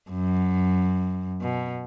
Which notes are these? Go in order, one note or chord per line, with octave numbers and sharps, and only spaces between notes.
F#2
B2